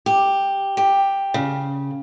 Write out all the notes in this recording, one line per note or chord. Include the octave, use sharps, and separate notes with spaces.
G4
G4
C#3